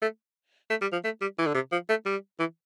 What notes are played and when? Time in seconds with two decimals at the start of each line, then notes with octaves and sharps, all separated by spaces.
0.02 A3
0.70 A3
0.82 G3
0.93 F3
1.05 A3
1.21 G3
1.39 E3
1.47 D3
1.55 C3
1.72 F3
1.89 A3
2.06 G3
2.40 E3